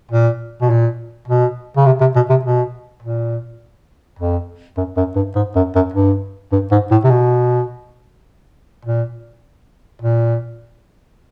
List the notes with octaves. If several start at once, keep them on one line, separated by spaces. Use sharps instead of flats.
A#2
B2
A#2
B2
C#3
C3
C3
B2
C3
B2
A#2
F2
F#2
F#2
G2
G#2
F#2
F#2
G2
G2
G#2
A2
C3
B2
A#2
A#2